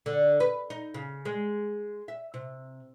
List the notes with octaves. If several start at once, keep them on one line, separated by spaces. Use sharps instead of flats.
D3
B4
D#4
C#3
G#3
E5
C3